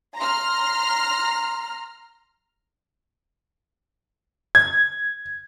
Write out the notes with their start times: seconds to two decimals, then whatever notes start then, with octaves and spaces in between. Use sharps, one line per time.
0.16 A#5 C6 F6
4.55 G#6